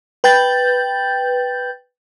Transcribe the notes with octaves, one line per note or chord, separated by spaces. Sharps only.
B4 G5 G6 A6